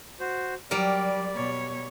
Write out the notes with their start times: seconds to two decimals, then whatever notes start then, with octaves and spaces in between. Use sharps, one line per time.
0.20 F#4 C5
0.71 F#3 G3 A#4 D5
1.35 B2 C#5